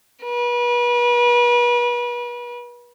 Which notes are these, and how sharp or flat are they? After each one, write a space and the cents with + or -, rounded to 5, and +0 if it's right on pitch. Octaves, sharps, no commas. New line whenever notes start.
B4 -35